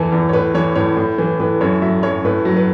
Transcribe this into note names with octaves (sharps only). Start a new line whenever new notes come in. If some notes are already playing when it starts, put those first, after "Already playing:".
Already playing: E2 E3 A4
E2
C#5
A2 B4
E3 C#5
A2 C#5
A2
E3
A2 B4
F#2 C#5
F#3 E5
F#2 C#5
A2 B4
F#3
B4